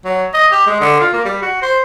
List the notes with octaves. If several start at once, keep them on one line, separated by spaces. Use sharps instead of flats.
F#3
D#5
G4
G#3
D3
F4
A#3
G3
F#4
C5